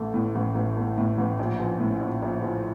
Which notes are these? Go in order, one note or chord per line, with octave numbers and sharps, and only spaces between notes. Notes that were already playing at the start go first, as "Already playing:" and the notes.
Already playing: A1 A3
A2
A1
A1
A3
A2
A1
A#1
F3
A2
A#1
A#1
F3